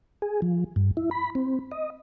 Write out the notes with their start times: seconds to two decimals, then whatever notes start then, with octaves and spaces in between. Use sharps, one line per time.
0.22 G#4
0.42 F3
0.76 G2
0.97 E4
1.11 B5
1.35 C4
1.71 D#5